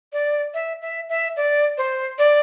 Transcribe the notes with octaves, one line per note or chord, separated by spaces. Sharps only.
D5
E5
E5
E5
D5
C5
D5